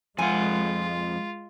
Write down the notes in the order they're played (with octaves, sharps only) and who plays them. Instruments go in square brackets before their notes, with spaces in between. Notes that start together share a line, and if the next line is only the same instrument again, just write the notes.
[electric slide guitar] F2 F#5 [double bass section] G#3 [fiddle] F4 [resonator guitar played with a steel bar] G#5